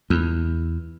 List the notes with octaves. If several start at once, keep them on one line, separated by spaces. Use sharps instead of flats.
E2